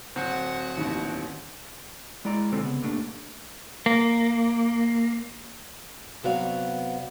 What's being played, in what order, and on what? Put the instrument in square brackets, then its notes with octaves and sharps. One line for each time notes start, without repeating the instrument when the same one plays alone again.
[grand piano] D1 C4 [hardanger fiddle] F#4
[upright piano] A1 D#2
[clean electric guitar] G#3 E4 D5 A#5
B1 F2 D3 G#3 C4 A4
C#3 B3
G2 A#2 A3 D4
[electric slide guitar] A#3
[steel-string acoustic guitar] C3 F#3 B3 F#4 D5 F5